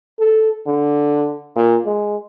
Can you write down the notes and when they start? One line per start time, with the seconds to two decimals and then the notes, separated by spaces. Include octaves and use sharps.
0.19 A4
0.67 D3
1.56 A#2
1.85 G#3